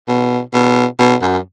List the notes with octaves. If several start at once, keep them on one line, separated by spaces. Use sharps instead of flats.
B2
B2
B2
F#2